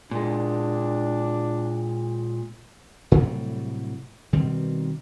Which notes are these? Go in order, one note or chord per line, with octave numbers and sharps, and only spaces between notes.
A#2 G#3 D4
A2 C3 F#3 G3
B2 D#3 G3 C4